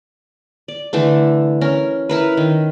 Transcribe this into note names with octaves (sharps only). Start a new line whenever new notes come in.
D5
D3 E3 A3 D4
C#4 A#4
E4 A#4 B4
D#3